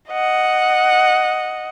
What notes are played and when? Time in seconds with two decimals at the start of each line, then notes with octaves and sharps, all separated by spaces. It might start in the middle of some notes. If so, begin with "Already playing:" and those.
0.10 D#5 F#5